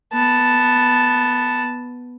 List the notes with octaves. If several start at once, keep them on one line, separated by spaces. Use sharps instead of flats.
B3 A5